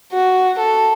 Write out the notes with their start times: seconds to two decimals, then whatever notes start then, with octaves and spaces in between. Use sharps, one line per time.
0.12 F#4
0.59 A4